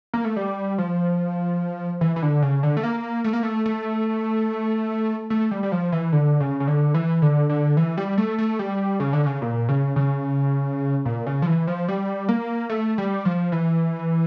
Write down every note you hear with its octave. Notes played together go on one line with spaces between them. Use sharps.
A#3
A3
G3
F3
E3
E3
D3
C#3
D3
A3
A#3
A3
A#3
A3
A3
A3
G3
G3
F3
E3
D3
C#3
C#3
D3
E3
D3
D3
E3
G3
A3
A3
G3
C#3
D3
C#3
A#2
C#3
C#3
A#2
C#3
F3
E3
F3
G3
A#3
A3
G3
F3
E3